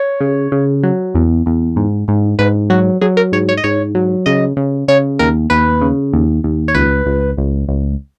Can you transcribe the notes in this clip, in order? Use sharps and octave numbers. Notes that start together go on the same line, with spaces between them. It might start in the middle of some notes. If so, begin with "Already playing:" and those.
Already playing: C#5
C#3
C#3
F#3
E2
E2
G#2
G#2
G#2 B4
F#3 F#4
F#3 G#4
A#4
G#2 C#5
C#5
D#5
G#2 C#5
F#3
C#3 D#5
C#3
C#3 C#5
D#2 A#4
D#2 B4
C#3
D#2
D#2
C#5
C#2 B4
C#2
C#2
C#2